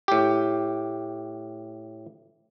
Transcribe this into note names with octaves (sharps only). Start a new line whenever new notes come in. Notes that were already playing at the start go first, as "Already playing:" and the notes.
A2 G4